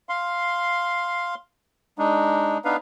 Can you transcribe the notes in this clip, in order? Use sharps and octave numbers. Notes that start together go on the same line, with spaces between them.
F5 C6
G#3 D4 D#4
B3 D4 D#4 B4 F5